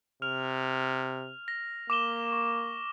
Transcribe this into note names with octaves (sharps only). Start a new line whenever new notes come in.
C3 F6 F7
A#6
A#3 D6 E7 G7
C#6